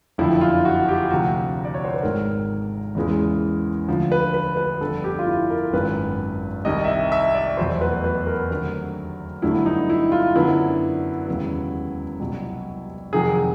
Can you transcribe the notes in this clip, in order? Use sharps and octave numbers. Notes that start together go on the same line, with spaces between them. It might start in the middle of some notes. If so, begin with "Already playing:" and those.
F#1 F2 D3 F3 E4
F4
F#4
G4
D2 C3 F3 F#4
D5
C#5
C5
B4
G#1 G#2 D#3 G#3 A#4
E2 C#3 E3 G#3
D2 D3 F3
B4
B4
B4
G1 F2 D3 G3 A4
G4
F4
E4
A#4
G#1 F#2 D#3 F#3 B3 B4
C2 C3 D#3 D#5
E5
D#5
E5
D5
F1 E2 B2 F#3 C5
B4
B4
A#4
D#2 D3 F#3 A3 C4
G1 G2 D3 F#3 A3 E4
D#4
E4
F4
F#2 D3 F#3 B3 E4
E1 D#2 C#3 F#3 B3
C2 B2 F#3
F2 C3 D#3 F#3 G#4